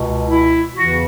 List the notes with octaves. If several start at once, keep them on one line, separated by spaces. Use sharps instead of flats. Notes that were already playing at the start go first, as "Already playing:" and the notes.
Already playing: C#2 B2
E4
E2 C#3 E3 F#4